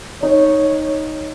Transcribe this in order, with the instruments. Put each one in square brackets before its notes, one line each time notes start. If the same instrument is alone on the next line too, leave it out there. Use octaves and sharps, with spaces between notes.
[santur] D#4 [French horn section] C#5